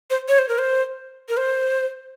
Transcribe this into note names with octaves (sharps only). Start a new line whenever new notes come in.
C5
C#5
C5
A#4
C5
A#4
C5